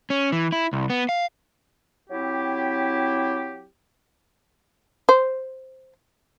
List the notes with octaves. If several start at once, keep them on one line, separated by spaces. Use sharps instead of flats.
C#4
E3
E4
C2
B3
F5
F#3 C4 E4 G4
C5